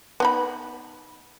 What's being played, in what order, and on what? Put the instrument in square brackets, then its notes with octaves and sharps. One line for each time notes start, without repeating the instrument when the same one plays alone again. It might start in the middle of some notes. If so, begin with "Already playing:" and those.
[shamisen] B3 D#4 B5